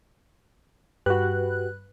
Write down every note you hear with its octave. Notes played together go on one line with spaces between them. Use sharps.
G2 F#4 G4 B4 F#6